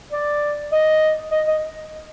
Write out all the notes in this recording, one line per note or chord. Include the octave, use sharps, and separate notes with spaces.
D5
D#5
D#5
D#5